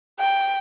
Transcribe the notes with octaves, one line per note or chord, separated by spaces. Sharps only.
G5